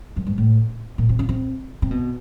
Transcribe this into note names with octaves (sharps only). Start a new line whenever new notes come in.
F#2
G2
A2
A#2
C3
C#3
C3
C3
B2